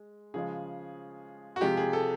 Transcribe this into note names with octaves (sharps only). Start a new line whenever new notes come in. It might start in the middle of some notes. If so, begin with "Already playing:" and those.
Already playing: G#3
C#3 F3 G#3 G#4
F#4
C3 F3 G#3 G4
G#4
A4